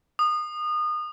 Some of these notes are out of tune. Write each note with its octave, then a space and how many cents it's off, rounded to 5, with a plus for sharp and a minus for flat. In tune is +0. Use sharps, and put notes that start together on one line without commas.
D#6 -30